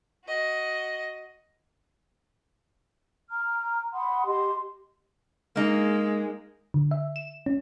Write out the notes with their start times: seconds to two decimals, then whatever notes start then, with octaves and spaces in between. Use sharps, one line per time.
0.25 F#4 D#5
3.31 A#5 F6
3.93 F#5 B5 C6 D#6
4.26 G4 D#5 C6
5.56 G#3 A#3 D#4
6.74 D3
6.91 E5
7.16 E7
7.46 C#4